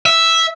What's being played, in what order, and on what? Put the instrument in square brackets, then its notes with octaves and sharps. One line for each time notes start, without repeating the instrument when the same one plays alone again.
[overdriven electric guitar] E5